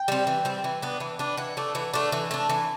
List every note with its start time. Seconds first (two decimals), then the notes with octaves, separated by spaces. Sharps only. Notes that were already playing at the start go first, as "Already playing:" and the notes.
Already playing: G5
0.08 G3 C4
0.27 E3
0.45 G3 C4
0.64 E3
0.82 B3 D4
1.00 E3
1.19 B3 D4
1.37 E3 F#5
1.57 A3 D4
1.75 E3
1.94 A3 D4
2.12 E3
2.31 A3 D4
2.50 E3